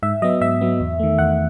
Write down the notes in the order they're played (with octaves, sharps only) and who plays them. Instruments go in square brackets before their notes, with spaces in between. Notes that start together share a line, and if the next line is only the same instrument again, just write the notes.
[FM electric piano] G#2 E5
F#3 B3 D#5
G#2 E5
F#3 B3
E2
D#3 A3
E2 F#5